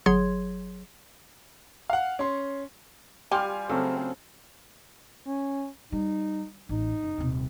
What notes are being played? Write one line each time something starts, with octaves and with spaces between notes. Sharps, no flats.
G1 F#3 G#4 C#5 C6 G#6
F5 F#5
C#4 C6
G3 F4 G4 G#5 C6 F6
C#3 F#3 A3 C4 C#4 F4 A4
C#4
G3 D#4
A1 D#4
F#1
D#1 C3